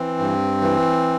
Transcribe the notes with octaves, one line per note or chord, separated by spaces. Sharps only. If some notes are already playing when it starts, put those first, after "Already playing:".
Already playing: E3 C4
G2
E3